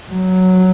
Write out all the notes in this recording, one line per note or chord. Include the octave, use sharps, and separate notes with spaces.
F#3